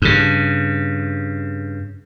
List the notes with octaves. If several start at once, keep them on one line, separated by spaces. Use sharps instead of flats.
G2 C#3